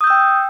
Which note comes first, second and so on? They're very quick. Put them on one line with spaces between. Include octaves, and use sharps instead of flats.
D#6 G6 E6 G5